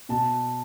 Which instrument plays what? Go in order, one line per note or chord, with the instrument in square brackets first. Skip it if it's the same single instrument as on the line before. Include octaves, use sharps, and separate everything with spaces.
[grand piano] B2 A5